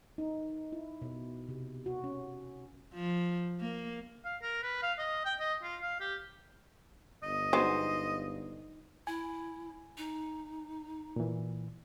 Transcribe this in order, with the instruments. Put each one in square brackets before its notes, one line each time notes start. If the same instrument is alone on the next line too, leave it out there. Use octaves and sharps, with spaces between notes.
[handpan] D#4
E4
B2
C3
F#4
C#4
[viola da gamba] F3
A#3
[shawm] F5
A#4
B4
F5
D#5
G5
D#5
F4
F5
G4
[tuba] G1 [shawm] D#5
[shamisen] F#3 G#3 B3 [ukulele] D#4 C5
[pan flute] E4 [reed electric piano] G#5
[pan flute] D#4
[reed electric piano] A#2 E3